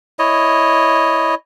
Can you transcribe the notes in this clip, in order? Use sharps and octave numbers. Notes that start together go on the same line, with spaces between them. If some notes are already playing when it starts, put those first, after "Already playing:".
E4 C#5 D#5